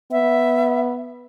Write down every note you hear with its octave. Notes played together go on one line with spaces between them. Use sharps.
B3 E5